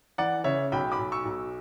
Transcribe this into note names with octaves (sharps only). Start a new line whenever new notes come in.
E3 D5 F#5
C#3 C#5 E5
B1 G5 B5
B5 D6
B1
C#6 E6
B1